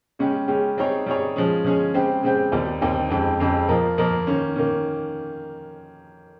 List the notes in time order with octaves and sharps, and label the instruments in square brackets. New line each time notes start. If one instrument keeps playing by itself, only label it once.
[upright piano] C#3 G#3 C#4 G4
C#3 G#3 C#4 G4
G3 C4 D#4 G#4 C#5
G3 C4 D#4 G#4 C#5
F3 G#3 C#4 G#4
F3 G#3 C#4 G#4
C#3 G#3 C4 G4 C5
C#3 G#3 C4 G4 C5
D#2 D#3 G3 C4 D#4
D#2 D#3 G3 C4 D#4
F2 C#3 G#3 C4 G4
F2 C#3 G#3 C4 G4
F3 A#3 F4 A#4 D#5
F3 A#3 F4 A#4 D#5
D#3 A#3 C#4
D#3 A#3 C#4